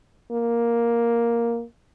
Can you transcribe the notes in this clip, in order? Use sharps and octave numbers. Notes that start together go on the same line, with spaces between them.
A#3